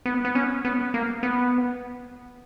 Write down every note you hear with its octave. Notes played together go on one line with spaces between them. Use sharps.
B3
B3
C#4
B3
A#3
B3